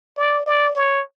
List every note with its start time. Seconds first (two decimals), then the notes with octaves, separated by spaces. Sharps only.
0.17 D5
0.46 D5
0.75 C#5